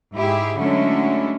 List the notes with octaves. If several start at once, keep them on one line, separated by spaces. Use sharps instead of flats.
G#2 E4 G4 G#4
D3 F#3 G#3 A3 C#4 E4